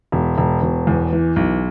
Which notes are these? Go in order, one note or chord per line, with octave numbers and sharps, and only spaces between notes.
E1
E1
E1
E2
E3
B1